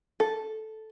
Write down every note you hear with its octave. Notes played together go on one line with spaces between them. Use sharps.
A4